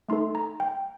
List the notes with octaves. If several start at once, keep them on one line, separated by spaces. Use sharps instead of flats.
A3 D#4 A4 C6
A#5
G5